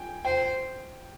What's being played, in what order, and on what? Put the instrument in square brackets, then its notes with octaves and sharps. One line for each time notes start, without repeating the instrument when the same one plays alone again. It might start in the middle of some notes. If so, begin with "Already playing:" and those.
Already playing: [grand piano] G5 G#5
[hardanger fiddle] C5 [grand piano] G5